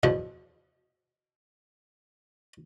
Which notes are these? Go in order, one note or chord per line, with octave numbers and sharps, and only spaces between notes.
E2 B2 F3